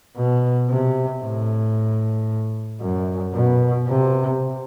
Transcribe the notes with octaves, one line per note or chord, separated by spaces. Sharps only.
B2
C3
A2
F#2
B2
C3